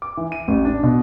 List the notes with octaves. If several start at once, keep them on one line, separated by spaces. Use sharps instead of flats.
D6
E3
D#7
A1
D4
B2